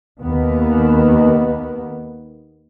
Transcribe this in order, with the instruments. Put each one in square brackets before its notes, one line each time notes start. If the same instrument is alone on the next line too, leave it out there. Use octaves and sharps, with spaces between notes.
[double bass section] D#2 D#3 B3